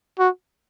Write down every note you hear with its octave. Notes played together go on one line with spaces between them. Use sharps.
F#4